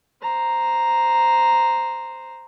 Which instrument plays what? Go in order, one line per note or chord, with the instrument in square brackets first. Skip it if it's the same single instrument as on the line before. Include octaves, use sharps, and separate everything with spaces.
[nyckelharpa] C5 A#5